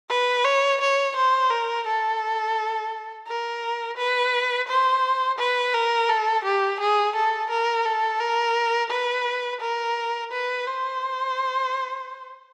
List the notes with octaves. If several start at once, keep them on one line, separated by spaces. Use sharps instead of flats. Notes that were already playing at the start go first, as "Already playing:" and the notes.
B4
C#5
C#5
C5
A#4
A4
A#4
B4
C5
B4
A#4
A4
G4
G#4
A4
A#4
A4
A#4
B4
A#4
B4
C5